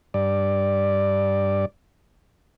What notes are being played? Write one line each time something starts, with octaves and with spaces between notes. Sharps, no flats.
G2 D5